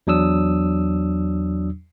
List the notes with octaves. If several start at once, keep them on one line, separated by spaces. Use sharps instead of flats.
E2 F#3 D4 D#6 E6